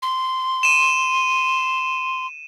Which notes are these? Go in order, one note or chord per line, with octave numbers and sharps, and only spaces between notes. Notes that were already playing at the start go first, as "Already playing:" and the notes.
C6
D#7 E7